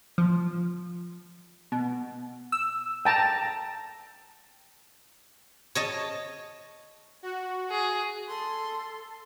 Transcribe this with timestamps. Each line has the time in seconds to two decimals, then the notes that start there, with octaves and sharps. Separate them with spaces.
0.18 F3
1.72 B2
2.52 E6
3.05 G5 A5 A#5
5.75 C#5 D#5 A5
7.23 F#4
7.70 G#4
8.28 A4 C6